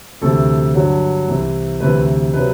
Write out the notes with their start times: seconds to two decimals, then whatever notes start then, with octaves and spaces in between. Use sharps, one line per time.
0.21 D2 C3 E3 A4
0.75 G2 D3 F#3
1.28 C2 C3 E3
1.80 D2 C3 E3 B4
2.33 C3 F#3 B4